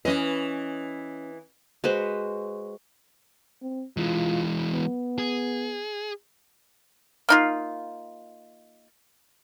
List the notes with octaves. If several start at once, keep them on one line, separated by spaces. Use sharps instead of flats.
E3 C#4 B4 D#5
G#3 F#4 B4 C5
C4
E3 G#3 F4
B3
G#4
A#3 D#4 F4